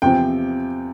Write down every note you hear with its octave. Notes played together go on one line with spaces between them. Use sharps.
E2 C3 F3 C4 G5